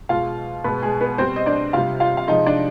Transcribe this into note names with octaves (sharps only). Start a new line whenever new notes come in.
B2 G#3 F4 F5
B2 G#3 B3 B4
G#3 G#4
B3 B4
B2 G3 C4 C5
D#5
D4 D5
C3 G3 F4 F5
F4 F5
F5
C3 F3 G#3 D#4 D#5
D4 D5